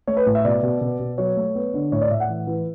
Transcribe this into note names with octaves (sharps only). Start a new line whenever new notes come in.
A3 C#5
B4
A2
E5
B2 D5
B2
B2
B2
F#3 C#5
A3
B3
D3
A2 C#5
D5
A2 E5
F#5
E3
E3